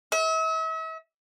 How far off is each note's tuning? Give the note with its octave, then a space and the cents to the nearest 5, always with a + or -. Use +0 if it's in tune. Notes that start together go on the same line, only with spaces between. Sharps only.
E5 -40